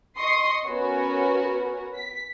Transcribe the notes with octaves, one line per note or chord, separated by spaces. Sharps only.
D#5 C6 C#6 D#6 C7
B3 C#4 F#4 A#4
B6